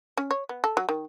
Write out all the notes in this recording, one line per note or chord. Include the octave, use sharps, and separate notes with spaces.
C#4
C#5
B3
A4
F#3
D#3